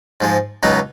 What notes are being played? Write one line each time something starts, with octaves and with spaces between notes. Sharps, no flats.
G#2 F3 G#3
C#2 B2 F#3 B3 D#4